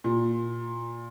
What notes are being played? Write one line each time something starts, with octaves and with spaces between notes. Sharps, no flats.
A#2